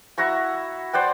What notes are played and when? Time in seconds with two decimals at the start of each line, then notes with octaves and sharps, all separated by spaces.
0.18 E4 F#4 A#5 C#6
0.93 C5 D5 F#5 G5